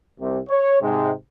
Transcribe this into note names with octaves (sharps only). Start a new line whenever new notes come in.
C2 C3
C#5
G#2 C3 G#3